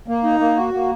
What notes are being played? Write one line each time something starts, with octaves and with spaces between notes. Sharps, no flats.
A#3
D#4
A#3
F#4
A#3